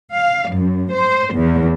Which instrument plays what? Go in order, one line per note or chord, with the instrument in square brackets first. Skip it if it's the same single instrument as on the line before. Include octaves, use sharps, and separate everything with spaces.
[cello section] F5
F#2
C5
E2